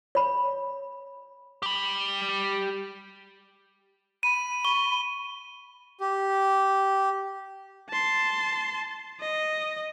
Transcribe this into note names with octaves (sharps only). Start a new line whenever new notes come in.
C#5 B5
G4 B5
B5 D#7
C#6 G7
G4
A5 C6
D#5